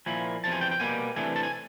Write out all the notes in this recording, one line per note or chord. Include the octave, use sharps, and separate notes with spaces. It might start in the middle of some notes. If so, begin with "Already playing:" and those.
A#2 F3 A#3 E4 G#5
E2 C3 F3 A5
G#5
G5
G5
B2 G3 A#3 G#5
C3 E3 A3 D4 G#5
A5
G#5